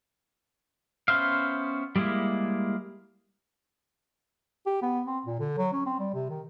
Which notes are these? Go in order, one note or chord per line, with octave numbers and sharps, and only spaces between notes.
B3 C#4 C5 E5 F5
G3 G#3 A#3 E4
G4
B3
C4
A#2
D3
F#3
C#4
C4
G3
C3
D#3